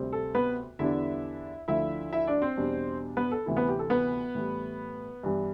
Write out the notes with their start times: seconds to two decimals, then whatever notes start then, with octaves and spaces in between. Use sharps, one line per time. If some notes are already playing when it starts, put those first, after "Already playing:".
Already playing: D2 C3 G3 C4
0.13 A4
0.35 B3 B4
0.79 E2 D3 G3 B3 D4 E4 E5
1.68 D2 D3 F3 A3 E4 E5
2.13 E4 E5
2.27 D4 D5
2.42 C4 C5
2.57 E2 B2 G3 D4
3.17 B3 B4
3.32 A4
3.46 D2 C3 E3 B3 E4
3.56 B3 B4
3.69 G4
3.79 A4
3.90 B3 B4
4.35 A2 E3 G3
5.23 G2 E3 G3 B3